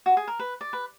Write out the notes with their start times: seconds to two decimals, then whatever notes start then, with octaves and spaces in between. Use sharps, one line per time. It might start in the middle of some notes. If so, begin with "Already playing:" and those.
0.06 F#4
0.17 G#4
0.27 A#4
0.39 B4
0.61 D5
0.73 B4